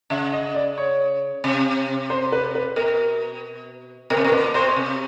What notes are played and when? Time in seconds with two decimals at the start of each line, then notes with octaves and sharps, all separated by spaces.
0.10 C#3 E5
0.33 D#5
0.55 D5
0.78 C#5
1.44 C3
2.10 C5
2.32 B4
2.55 B4
2.76 B2 A#4
4.10 B2 A#4
4.17 C3
4.24 B2
4.27 A#4
4.32 A#2 B4
4.54 B2 C5
4.76 C3